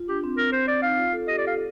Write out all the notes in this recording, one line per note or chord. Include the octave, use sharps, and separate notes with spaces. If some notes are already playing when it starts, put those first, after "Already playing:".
Already playing: F4
D4 G4
C4
C4 A#4
C5
D5
D#4 F5
F4
A4
G4 D#5
D5
A4 F5